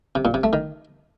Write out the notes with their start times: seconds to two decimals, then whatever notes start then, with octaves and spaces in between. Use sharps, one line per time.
0.15 C3
0.25 A#2
0.34 C3
0.44 A3
0.53 D#3